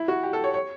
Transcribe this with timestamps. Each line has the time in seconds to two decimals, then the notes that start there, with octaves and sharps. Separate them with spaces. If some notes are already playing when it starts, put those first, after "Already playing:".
Already playing: E4
0.08 F#4
0.23 G4
0.33 A4
0.44 C#5
0.54 C#5